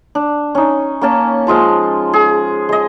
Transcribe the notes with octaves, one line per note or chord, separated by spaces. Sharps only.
D4
C#4 D#4
A#3 C#4 A5
F3 G#3 F4 A5
G#4
G#3 D#5